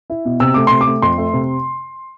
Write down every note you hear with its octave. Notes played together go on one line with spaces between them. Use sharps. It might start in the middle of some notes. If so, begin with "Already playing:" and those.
E4
B2
C3 E6
A3 D6
C3 C6
D6
A3
F2 C6
A3
C3